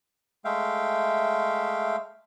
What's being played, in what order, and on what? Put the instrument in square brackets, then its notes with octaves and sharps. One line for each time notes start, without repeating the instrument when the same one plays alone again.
[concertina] G#3 A3 E5 F5 G5